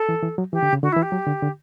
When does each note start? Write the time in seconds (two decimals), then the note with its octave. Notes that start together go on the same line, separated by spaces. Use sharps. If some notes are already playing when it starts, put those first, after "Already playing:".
Already playing: A4
0.09 E3
0.23 E3
0.38 F#3
0.53 E3 G4
0.63 D3
0.73 C#3
0.83 D3 F#4
0.92 E4
0.97 E3
1.02 G4
1.12 F#3
1.27 D3
1.42 D3